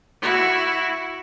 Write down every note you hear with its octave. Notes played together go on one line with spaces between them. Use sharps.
E4 F#4